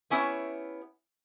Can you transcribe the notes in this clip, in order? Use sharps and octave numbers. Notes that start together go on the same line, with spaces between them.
B3 C#4 E4 G4 C#5 E5